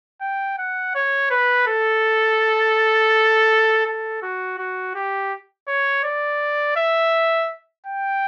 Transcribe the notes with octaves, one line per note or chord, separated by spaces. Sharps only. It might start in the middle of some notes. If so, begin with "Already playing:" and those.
G5
F#5
C#5
B4
A4
A4
F#4
F#4
G4
C#5
D5
E5
G5